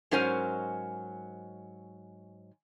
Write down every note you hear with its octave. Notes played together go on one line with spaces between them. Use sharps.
G#2 F#3 C#4 A#4 C5 G#5